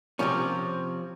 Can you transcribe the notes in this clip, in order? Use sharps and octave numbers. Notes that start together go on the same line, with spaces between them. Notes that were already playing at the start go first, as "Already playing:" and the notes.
C3 F3 C#4